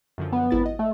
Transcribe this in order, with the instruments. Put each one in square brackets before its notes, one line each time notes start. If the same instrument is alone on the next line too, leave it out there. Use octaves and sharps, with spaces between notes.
[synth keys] F#2 D3 F3
[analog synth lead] B3
[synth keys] G#1 E4 A6
D#5
[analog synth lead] A3